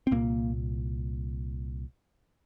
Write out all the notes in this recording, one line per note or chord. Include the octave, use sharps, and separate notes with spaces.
C4
C2 A#2 A#3